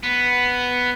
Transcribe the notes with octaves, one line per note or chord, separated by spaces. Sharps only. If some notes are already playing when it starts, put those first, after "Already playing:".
B3